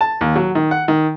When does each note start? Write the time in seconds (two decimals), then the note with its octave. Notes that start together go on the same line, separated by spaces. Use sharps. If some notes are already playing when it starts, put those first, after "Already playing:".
0.01 A5
0.21 D#2
0.36 F#3
0.55 D#3
0.71 F#5
0.88 D#3